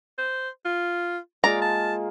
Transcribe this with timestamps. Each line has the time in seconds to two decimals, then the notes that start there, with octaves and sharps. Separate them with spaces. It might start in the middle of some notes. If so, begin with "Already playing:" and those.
0.18 C5
0.65 F4
1.44 G#3 A#3 F4 D5 A#5
1.62 A5